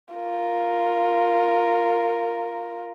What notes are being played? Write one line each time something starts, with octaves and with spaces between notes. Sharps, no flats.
F4 A#4